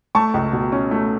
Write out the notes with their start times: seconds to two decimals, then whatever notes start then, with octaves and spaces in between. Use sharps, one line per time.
0.15 A3 A5 C#6
0.34 C#2
0.53 B2
0.72 C#4
0.91 A3